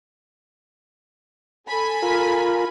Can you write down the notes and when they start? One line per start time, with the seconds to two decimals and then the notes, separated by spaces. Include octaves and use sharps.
1.68 A4 G#5 B5
2.02 F4 A#4